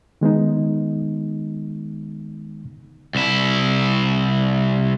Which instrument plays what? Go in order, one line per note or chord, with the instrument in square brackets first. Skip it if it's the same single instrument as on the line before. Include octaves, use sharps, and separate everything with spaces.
[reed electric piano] D#3 G#3 B3 D#4
[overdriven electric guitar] C2 E4